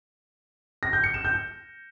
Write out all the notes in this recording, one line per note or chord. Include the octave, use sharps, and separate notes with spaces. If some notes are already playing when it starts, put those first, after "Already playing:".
A#6
G6
C#7
E7
G6